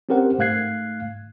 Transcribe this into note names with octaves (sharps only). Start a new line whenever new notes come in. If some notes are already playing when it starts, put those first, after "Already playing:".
C4 C#4 G4 A#4 C5 F#5
G#2 A3 F5 F#6 G#6 C7